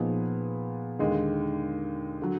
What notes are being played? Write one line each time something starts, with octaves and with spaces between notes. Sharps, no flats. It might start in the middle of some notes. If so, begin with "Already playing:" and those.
Already playing: A#2 F3 B3 D#4 G#4
D#2 D3 G#3
D3 F#3